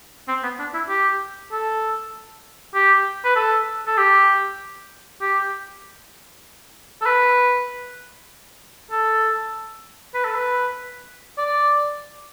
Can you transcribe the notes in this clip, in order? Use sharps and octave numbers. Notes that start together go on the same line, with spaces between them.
C4
B3
D4
E4
G4
A4
G4
B4
A4
A4
G4
G4
A4
B4
A4
B4
A4
B4
D5